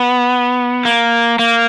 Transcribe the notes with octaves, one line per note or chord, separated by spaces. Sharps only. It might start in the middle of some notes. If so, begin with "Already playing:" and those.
Already playing: B3
A#3
A#3